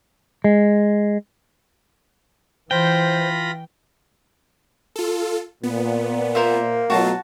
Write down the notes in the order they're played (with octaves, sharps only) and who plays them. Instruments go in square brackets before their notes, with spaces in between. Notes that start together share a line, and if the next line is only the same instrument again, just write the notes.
[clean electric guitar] G#3
[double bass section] E3 [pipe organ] F4 B5 A#6 [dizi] C5 [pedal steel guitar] G5
[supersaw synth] F4 A4
[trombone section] A#2 [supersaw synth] B3
[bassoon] A#3 [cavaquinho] A#4 C5 E5
[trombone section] B2 F#3 [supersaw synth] A3 F4 [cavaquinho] F#4 A5